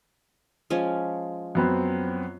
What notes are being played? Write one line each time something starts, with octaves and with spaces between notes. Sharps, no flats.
F3 G#3 C#4
F#2 B3 C4